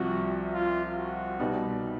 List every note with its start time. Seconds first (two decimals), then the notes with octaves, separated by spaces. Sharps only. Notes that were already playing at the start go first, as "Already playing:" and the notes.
Already playing: C2 C3 F3 F#4
0.53 F4
0.96 F#4
1.39 C2 B2 G3 B3 D#4